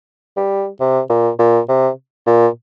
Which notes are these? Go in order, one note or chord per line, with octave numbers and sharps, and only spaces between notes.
G3
C3
A#2
A#2
C3
A#2